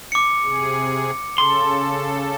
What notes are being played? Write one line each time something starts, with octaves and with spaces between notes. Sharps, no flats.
D6 C#7
C3 G#4
C#3 A4 C6